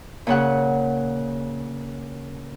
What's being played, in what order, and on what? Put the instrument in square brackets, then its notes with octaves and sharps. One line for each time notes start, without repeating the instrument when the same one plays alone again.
[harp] A#2 C#3 F#5